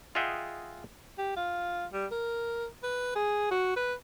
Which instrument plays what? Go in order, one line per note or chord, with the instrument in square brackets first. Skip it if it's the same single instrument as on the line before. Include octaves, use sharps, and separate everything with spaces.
[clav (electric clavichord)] F4 G#4 D#5 E5 F#5 G5
[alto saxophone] G4
F4
G3
A#4
B4
G#4
F#4
B4